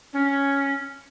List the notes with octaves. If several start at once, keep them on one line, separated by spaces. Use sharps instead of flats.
C#4